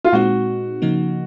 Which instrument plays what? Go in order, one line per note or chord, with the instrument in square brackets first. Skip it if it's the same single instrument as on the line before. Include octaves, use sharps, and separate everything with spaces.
[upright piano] F4
[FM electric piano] A#2 G#3 C4 D#4 [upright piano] F#4
[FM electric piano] C#3 F3 A#3 D#4